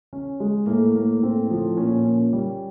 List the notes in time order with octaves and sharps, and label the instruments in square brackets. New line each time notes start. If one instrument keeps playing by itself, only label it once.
[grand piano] C#4
G#3
[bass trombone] A2 [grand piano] A#3
[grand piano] A#3
[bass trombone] A2 [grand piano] C4
[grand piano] F3
[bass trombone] A#2 [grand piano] C#4
[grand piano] C#4
G3